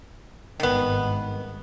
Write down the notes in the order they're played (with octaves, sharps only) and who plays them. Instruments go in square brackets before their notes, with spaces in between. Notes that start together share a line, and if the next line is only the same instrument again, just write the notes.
[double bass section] G#1 G2 [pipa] D#3 B3